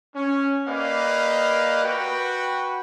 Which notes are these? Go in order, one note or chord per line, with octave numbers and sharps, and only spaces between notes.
C#4
A#3 G4 B4 D5 D#5 F5
F#4 B4 G5